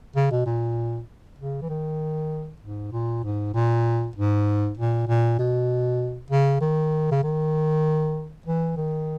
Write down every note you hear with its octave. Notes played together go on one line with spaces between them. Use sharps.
C#3
B2
A#2
C#3
E3
D#3
G#2
A#2
G#2
A#2
G#2
A#2
A#2
B2
C#3
D#3
C#3
D#3
E3
D#3